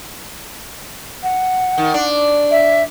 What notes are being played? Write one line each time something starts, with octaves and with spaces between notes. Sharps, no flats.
F#5
D#3
D4
E5